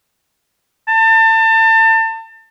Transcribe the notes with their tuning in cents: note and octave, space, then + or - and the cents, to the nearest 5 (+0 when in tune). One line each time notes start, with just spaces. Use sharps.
A5 +30